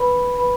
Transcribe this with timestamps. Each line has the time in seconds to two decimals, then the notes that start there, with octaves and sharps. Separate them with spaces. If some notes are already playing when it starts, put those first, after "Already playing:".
Already playing: B4 B5
0.38 B4 B5